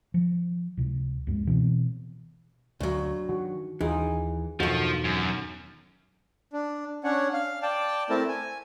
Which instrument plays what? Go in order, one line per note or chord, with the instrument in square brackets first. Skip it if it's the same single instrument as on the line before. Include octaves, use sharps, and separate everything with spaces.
[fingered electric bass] F3
C#2 C3
C#2 G2 G#3
B2 E3 C4
[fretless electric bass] D2 [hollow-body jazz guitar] G2 F#3
[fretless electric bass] D#3 [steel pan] F#4
[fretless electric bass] D#2 [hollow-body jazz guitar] E3 [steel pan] D#4 F4 G#4
[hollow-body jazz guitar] B1 D#3 [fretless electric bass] E2 G2 [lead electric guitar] F3 [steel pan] F#4 A4
[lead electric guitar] F#2
[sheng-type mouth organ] D4
C#4 D4 C#5 F#5
F5
D5 G5 A5
A3 C4 E4 A#4 A5
G#5